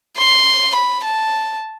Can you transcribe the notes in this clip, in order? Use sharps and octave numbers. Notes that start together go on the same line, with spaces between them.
C6
B5
A5